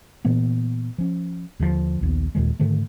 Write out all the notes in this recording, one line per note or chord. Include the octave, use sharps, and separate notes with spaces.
A#2 E3 A#3 B3
F3 C#4
D#2 D3 D#3 F3
A#1 D#2 B3
D#2 A#2 D#3 G#3
G#2 D3 D#3 A3